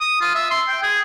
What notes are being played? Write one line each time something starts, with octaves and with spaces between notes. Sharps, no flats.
D#6
F4
E5
C6
G5
G#4